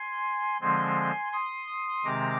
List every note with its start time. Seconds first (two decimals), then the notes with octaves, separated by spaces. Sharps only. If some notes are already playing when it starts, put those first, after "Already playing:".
Already playing: G#5 C6
0.61 D3 F3 G#3 C4 G#5 C6
1.32 C6 D#6
2.05 C3 D#3 G#3 C4 A#5 D6